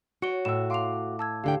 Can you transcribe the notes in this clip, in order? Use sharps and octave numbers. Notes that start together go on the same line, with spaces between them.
F#4 C#5 C#7 D7 G7
A2 E5 E6 E7
F5 C6 D6 F7
A5 E6 G#6
D2 D3 G4 F5 G5